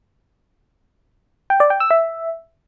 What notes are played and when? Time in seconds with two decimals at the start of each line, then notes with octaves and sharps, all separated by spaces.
1.50 G5
1.60 D5
1.70 G5
1.80 E6
1.91 E5